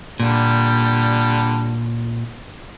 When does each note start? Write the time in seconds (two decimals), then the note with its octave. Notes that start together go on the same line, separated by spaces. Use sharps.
0.20 A#2 D3 G3